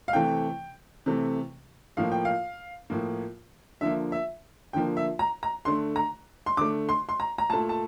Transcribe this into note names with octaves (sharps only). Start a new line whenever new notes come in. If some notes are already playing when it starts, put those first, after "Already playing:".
F5
C3 E3 A3 G5
C3 E3 A3
A2 F3 A#3 F5
G5
F5
A2 F3 A#3
D3 F3 A#3 E5
E5
D3 F3 A#3 G5
E5
A#5
A#5
D3 A3 C6
A#5
C6
D3 A3 D6
C6
C6
A#5
A#5
A#2 A3 A5
A5